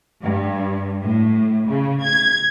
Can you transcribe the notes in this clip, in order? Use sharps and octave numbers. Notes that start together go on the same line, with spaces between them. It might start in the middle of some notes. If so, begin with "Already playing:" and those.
G2
A2
C#3
G#6